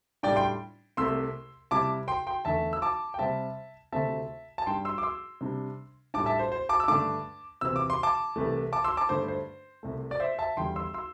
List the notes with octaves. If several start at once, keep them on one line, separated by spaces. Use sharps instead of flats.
A2 G3 D4 D5 G5
G5 C6
C2 C3 A3 C6 E6
C3 G3 E4 A5 D6
G5 C6
G5 C6
E2 D3 A3 E5 A5
E6
A5 D6
G5
C3 G3 C4 E5 A5
D2 C3 A3 C4 E5 A5
A5
G2 G3 D4 G5 C6
C6 E6
D6
C6 E6
C3 G3 D4
A2 G3 D4 A5 D6
E5 A5
C5
C5
A5 D6
E6
G2 D3 A3 D4 A5 D6
C3 E3 C4 E6
D6
C6
A5 D6
C2 C3 E3 A3
A5 D6
C6 E6
A5 D6
G2 D3 A3 D4 C5
C5
C2 C3 A3
D5
C5 E5
E5 A5
E2 D3 G3 E4 G5 C6
C6 E6
C6 E6